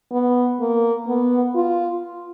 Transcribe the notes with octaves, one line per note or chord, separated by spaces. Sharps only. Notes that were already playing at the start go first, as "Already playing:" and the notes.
B3
A#3
B3
F4